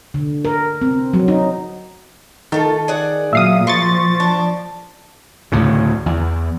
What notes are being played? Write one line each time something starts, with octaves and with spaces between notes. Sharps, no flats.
D3
A#4
C4
F#3
D#4
D#3 A3 F4 A4
G#4 D5 F#5
A#2 F#3 E5 F5 D#6
A#2 F3 C6 C#6 A6
D4
D2 A2 C#3
E2